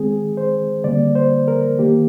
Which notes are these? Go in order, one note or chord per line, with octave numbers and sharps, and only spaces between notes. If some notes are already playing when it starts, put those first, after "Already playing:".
Already playing: D#3 G#3 C4 G#4
C5
D3 G3 A#3 D5
C5
A#4
D#3 A#3 G4